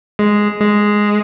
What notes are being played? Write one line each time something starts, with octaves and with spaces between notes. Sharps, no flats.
G#3
G#3